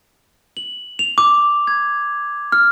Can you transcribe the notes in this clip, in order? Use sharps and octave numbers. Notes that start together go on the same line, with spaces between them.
F#7
F7
D6
G#6
F6